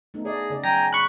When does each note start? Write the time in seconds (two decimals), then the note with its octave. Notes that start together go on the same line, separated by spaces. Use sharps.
0.14 A3 B3 D#4
0.25 G#4 D5 D#5
0.50 C#3 D5
0.64 F#3 G5 G#5 A#5 A#6
0.93 B5 C#6 F#6